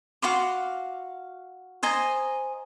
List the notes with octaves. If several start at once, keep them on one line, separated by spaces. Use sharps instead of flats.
F#4 F5 C6 D6
C5 D#5 G#5 A#5